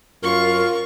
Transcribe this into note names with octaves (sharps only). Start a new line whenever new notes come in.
F#2 F4 A#4 C#6